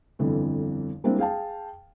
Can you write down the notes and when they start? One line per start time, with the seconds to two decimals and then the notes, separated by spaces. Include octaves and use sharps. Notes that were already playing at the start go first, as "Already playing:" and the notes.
0.19 G1 F2 D3 E3
1.04 G3 G#3 A#3 C4 D4 E4
1.18 G#4 F5 G5 A5